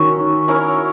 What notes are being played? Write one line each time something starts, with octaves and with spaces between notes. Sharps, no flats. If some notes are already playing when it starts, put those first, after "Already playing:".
Already playing: D#3 C#4 F#4 A#4 C#5 E5
C#4 E4 A#4 C#5